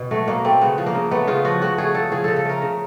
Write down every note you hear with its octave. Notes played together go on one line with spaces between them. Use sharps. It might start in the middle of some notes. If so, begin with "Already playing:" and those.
Already playing: B2
F#3 A3
B2 A#3
A3 C4
C#3 B3
F3
A#3
C#3
A3 B3
C#3 F4
F3 F#4
C#3 F#4
A3 G#4
C#3 A4
F3 G#4
C#3 A4
A4
A3 A#4
C#3